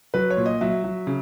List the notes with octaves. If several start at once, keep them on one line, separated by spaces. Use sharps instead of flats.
F#3 B4
C#5
A#2
D#5
F#3 E5
F#3
C#3